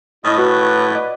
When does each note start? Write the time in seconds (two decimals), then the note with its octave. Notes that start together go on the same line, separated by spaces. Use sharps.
0.24 A2 E4 D#5 C#6 D#6 F6
0.38 F#4 B4
0.90 D5 D#5